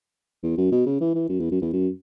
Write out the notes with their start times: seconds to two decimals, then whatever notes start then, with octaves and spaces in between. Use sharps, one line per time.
0.43 E2
0.57 F#2
0.72 B2
0.86 C#3
1.01 E3
1.15 E3
1.29 F#2
1.40 E2
1.51 F#2
1.62 E2
1.73 F#2